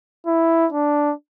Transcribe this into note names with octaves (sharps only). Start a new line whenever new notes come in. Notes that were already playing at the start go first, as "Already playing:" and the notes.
E4
D4